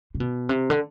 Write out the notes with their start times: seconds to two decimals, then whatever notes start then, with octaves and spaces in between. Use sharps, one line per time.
0.15 C3
0.20 B2
0.49 C3
0.70 D3